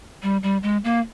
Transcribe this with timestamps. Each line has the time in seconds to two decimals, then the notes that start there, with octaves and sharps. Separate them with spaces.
0.23 G3
0.43 G3
0.63 G#3
0.84 A#3